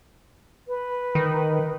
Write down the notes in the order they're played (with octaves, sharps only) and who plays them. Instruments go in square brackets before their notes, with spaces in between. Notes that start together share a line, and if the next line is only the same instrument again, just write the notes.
[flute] B4
[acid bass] D#3